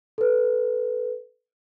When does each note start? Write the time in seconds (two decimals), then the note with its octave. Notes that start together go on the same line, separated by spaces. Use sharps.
0.18 A4 B4